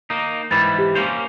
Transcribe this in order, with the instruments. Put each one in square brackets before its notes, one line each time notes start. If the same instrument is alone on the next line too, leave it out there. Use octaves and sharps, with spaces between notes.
[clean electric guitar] A#3 D#4
[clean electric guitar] G#2 E3 G3 [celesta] B5 A6
[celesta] G4
[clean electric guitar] A#3 C#4 C5 [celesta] F7